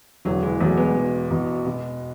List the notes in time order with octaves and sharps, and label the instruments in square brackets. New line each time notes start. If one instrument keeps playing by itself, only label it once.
[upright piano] E1 [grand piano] D3 F#3
[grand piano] E3 G#3
[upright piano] E2 B2 [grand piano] F#3 A3
[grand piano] G#3 B3
[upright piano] E1
E2 B2
B2